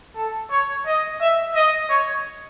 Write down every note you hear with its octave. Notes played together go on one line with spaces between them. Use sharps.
A4
C#5
D#5
E5
D#5
C#5